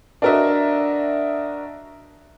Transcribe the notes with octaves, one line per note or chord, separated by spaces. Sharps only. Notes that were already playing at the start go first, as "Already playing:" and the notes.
D4 F#4 A#4 D#5 E5